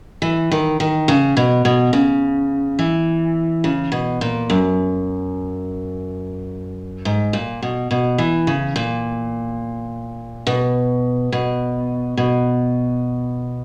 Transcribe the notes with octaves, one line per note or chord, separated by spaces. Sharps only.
E3
D#3
D#3
C#3
B2
B2
C#3
E3
C#3
B2
A#2
F#2
G#2
A#2
B2
B2
E3
C#3
A#2
B2
B2
B2